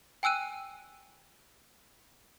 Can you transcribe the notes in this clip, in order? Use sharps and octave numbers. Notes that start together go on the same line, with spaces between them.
G5 G#5 E6 F#6 D#7